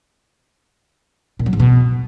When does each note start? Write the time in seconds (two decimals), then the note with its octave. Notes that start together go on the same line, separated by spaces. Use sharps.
1.39 A#2
1.46 F#3
1.53 G#2
1.60 B2